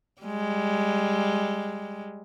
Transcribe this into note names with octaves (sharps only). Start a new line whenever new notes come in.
G3 G#3